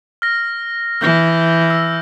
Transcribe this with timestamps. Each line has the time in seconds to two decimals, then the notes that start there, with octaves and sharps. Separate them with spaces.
0.22 F6 A#6
1.01 E3 F6 G6 A#6
1.70 E6